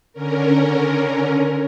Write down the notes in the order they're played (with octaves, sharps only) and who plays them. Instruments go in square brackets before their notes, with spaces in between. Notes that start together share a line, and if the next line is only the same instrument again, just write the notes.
[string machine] D3 C#4 A#4